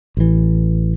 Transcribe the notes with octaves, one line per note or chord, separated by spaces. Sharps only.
A1 E3